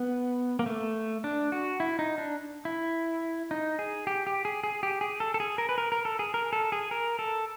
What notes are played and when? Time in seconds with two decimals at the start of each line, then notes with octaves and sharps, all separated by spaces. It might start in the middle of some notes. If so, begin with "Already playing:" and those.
Already playing: B3
0.59 A#3
0.66 A3
1.24 D4
1.52 F#4
1.80 E4
1.99 D#4
2.18 D4
2.65 E4
3.51 D#4
3.79 G#4
4.07 G4
4.27 G4
4.45 G#4
4.64 G#4
4.83 G4
5.01 G#4
5.20 A4
5.34 A4
5.40 G#4
5.58 A#4
5.69 B4
5.78 A#4
5.92 A#4
6.05 A4
6.19 G#4
6.34 A#4
6.53 A4
6.72 G#4
6.91 A#4
7.19 A4